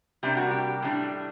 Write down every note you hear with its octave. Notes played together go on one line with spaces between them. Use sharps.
C3 G3 A#3 D4 G4
F#4
G4
A2 G3 D4